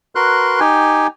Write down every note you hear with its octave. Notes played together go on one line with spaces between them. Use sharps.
F#4 A#4 B4 C6 F#6
D#4 G4 G5 G#5